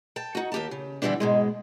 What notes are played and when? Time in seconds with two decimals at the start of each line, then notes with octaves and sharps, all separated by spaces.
0.16 G5 A5
0.35 D#4 F#4
0.52 D#2 G4 A5
0.71 C#3
1.02 D3 E3 F#3 G3 B3 D4
1.20 G#2 B2 G#3